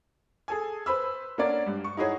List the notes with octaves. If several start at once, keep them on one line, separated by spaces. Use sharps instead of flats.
G#4 A4 G#5
B4 C5 B5 E6
A#3 C#4 D4 F#4 C#5 D5
G2
C#6
D#4 E4 F#4 G#4 C#5